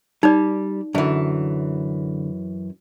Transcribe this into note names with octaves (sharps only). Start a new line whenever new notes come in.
G3 D#4 D5
F#2 D3 E3